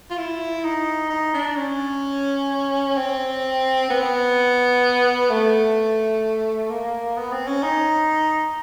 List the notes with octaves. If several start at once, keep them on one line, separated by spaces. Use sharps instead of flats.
F4
E4
D#4
D#4
D4
C#4
C4
B3
A3
A#3
B3
C4
C#4
D#4